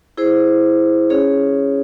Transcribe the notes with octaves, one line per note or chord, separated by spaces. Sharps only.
E4 G#4 C5
C#4 G#4 C#5